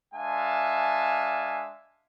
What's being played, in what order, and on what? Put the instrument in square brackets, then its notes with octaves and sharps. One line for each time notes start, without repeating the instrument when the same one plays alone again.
[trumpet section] G#3 D4 E5 F5 G#5 A5